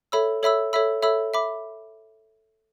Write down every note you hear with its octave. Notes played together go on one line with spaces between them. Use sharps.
A4 C#5 E5 B5 E6
A4 C#5 E5 B5 E6
A4 C#5 E5 B5 E6
A4 C#5 E5 B5 E6
E5 B5 D6